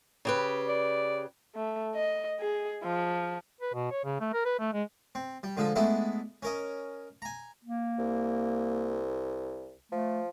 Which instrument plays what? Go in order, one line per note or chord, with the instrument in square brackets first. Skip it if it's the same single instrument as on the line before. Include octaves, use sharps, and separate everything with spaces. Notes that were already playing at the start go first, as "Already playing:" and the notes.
[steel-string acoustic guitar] C#3 G4 B4
[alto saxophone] D5
[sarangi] A3
D#5
G#4
F3
[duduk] B4
B2
C#5
C#3
A3
A#4
B4
A3
G#3
[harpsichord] C4
G3
D3 F3 G#3 A4
G#3 A3 B3 D4 E4 A4
C#4 A#4 D#5
G#5 A#5
[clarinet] A#3
[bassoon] C2
[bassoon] F3 [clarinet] A3